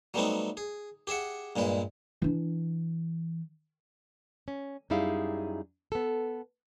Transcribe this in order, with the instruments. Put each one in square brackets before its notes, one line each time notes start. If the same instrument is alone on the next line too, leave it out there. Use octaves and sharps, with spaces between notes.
[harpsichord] F#3 G3 A3 B3 C4 D#4
G#4
G4 G#4 E5 F#5
G2 A#2 G#3 B4
[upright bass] E3 D4
[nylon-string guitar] C#4
F#2 G3 D#4 E4 G#4 F5
B3 A4